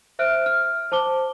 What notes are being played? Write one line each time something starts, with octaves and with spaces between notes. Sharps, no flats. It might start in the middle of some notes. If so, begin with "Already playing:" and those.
C5 E5 F6 F#6 D7
F6
C5 A5 D6 G7